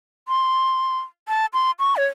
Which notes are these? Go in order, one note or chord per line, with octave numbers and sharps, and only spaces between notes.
C6
A5
C6
C#6
C#5